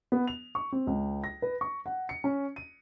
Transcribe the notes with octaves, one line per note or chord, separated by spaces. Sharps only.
B3
F7
C#6
C4
C#2
A#6
B4
C#6
F#5
C#7
C#4
D#7